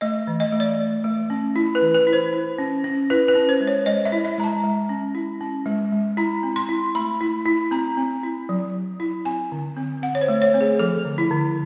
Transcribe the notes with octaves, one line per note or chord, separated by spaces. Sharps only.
A3 D#5
E3
D#5
A3
D5
A3
A3
C#4
E4
B4
E3
B4
E4
C5
E4
C#4
C#4
E4 B4
B4
C#4
C5
G#3
C#5
G#3 D#5
E5
E4
E5
G#3 A#5
A5
G#3
C#4
E4
C#4
G#3
G#3
E4 A#5
C4
C6
E4
A3 B5
E4
E4
C4 A#5
C4
E4
F#3
F#3
E4
C4 G#5
D3
C4
C4 F#5
C#5
C5
A3
C#5
C4
G#4
F3 A4
D3
E4
D3